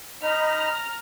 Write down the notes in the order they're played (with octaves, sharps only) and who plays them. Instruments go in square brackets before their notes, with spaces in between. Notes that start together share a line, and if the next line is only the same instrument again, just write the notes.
[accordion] D#4 D#5 B5 [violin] A#5 F6